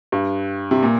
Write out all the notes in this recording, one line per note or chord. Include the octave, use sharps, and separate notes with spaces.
G2
C3
A#2